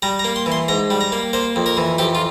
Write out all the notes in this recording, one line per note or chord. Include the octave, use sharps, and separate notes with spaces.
G3 A#5
A#5
A#3
C6
E3
C6
G#2 A#5
G3
A#5
A#3
A#3 C5
F2
A#4
E3
F2 G4
F4